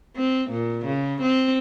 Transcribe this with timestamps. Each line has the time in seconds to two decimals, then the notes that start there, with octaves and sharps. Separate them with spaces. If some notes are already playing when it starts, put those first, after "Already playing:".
0.16 C4
0.50 A#2
0.85 C#3
1.22 C4